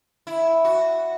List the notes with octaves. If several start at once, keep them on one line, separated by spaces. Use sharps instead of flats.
E4
F#4